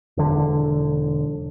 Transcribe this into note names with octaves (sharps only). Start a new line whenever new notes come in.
E1 D3